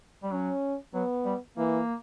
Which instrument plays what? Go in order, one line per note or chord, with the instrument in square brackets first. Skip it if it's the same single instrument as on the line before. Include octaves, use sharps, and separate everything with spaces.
[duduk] G3
[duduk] F#3 [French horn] C#4
[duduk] F#3 [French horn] B3
[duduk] G3
[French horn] E3 [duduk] A#3